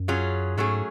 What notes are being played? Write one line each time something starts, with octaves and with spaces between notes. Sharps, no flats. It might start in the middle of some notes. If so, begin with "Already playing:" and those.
Already playing: F#2
F#3 C#4 F4 G#4
G#2 F#3 A3 C#4 G#4